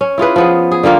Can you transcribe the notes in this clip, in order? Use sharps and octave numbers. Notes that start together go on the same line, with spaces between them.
C#4
E4 F4 G#4 B4
F3 B3 G#4
G#4
D3 G3 A#3 F4